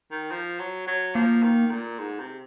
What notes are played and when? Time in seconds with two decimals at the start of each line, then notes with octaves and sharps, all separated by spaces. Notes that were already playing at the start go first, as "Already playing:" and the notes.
0.11 D#3
0.31 F3
0.59 F#3
0.87 F#3
1.15 F3 A#3
1.43 D#3
1.71 A#2
1.99 G#2
2.20 C3